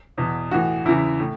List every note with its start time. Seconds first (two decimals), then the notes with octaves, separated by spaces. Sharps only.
0.18 E2 B2
0.51 A2 E3 F#4
0.85 E2 C#3 E3 E4
1.20 A2